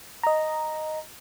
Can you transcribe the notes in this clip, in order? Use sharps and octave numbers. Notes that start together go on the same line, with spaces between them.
D#5 A#5